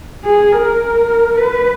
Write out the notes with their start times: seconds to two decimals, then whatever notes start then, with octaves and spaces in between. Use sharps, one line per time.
0.25 G#4
0.52 A#4
1.37 B4